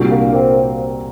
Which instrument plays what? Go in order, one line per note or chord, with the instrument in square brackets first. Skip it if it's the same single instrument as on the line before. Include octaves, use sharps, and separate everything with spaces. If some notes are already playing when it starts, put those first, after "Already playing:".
Already playing: [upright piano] C2 A#2 G3 D4 F#4
[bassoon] A#3
C4